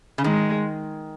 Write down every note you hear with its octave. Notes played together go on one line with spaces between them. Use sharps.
C#3
D#3 G#3